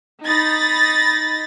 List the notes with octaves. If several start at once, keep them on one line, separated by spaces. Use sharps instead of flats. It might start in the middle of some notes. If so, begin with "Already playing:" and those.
D#4 B5 A6 A#6